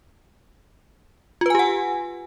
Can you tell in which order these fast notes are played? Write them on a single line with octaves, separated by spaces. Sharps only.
F4 B4 G#5 G4 F#5